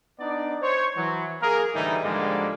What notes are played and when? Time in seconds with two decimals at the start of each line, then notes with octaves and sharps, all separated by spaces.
0.19 B3 D4 D#4 D5
0.62 C5 C#5
0.96 E3 F#3
1.42 A#3 G#4 A#4
1.74 A2 D3 E3 G3 D#4 E4
2.04 G#2 D3 F3 G3 G#3 A#3